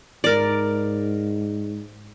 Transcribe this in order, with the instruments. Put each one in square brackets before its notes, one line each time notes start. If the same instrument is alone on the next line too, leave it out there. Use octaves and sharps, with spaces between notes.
[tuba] G#2 [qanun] A#4 D5